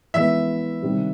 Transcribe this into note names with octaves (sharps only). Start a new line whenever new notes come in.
E3 G#3 B3 E5
C3 D#3 G3